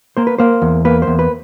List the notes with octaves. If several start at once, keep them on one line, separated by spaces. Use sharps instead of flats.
A#3 C5
B4
A#3 C5
E2
A#3 B4
C5
E2
B4